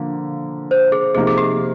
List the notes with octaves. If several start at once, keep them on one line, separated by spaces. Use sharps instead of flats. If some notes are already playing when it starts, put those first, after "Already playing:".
Already playing: D3 F3 A#3
C5
G#4
C3 F3 A#3 D#4 G#4
G#4
G4